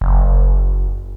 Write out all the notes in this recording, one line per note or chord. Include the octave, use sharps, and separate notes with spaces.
F#1